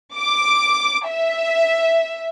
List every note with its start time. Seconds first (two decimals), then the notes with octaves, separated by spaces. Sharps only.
0.16 D6
1.09 E5